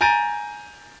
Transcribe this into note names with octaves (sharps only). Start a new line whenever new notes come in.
G#5 A#5 G6 A6 D7 D#7